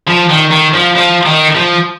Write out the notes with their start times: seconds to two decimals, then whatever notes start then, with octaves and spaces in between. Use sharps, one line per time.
0.08 F3
0.30 D#3
0.51 D#3
0.74 F3
0.96 F3
1.26 D#3
1.55 F3